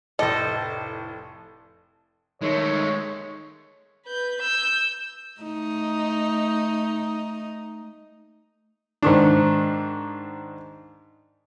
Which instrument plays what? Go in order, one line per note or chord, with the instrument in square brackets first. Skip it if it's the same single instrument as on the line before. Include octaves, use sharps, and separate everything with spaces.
[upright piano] F1 A2 D5 [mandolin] A4 C5 [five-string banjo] D#5
[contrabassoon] D#3 [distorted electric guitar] G#3 A3 [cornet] C#5
[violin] B4 G6
E6 G6
[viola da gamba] A3 D#4
[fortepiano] G#2 D#3 D4